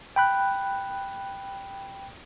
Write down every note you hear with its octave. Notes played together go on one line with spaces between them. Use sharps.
G5 B5 F#6